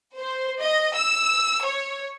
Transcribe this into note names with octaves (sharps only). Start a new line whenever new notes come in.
C5
D#5
E6
C#5